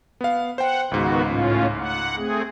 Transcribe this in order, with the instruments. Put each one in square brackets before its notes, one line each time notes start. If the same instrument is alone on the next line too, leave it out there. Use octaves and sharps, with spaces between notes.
[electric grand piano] B3 F5
[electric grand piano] C5 G5 [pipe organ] F#5
[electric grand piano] C#2 G#2 [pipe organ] D#3 B3 F#4
[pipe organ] A2 C#4 F4
F#5
A3 C4 G#4